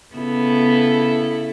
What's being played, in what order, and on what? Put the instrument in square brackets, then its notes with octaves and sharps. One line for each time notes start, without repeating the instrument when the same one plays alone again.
[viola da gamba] C#3 E4 A4 [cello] B3